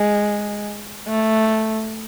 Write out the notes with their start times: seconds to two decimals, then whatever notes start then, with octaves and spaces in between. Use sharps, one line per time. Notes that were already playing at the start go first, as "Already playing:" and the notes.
Already playing: G#3
1.08 A3